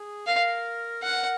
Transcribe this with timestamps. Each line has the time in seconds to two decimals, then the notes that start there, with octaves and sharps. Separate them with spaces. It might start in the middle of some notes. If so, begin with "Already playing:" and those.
Already playing: G#4
0.27 A#4 F5
1.03 A#4 F#5